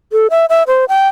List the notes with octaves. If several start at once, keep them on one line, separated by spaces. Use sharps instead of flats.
A4
E5
E5
C5
G5